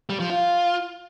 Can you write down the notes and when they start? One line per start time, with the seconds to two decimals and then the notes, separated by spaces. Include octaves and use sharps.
0.09 G3
0.20 F3
0.30 F4